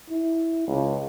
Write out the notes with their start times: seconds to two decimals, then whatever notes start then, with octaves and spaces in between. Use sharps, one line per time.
0.10 E4
0.67 C#2